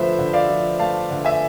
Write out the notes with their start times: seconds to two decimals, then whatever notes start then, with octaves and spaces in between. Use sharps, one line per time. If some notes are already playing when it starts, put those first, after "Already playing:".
Already playing: D3 F3 A3 B4 C5 E5
0.18 D3
0.33 D5 F5
0.49 F3
0.79 A3 F5 A5
1.10 D3
1.24 E5 G#5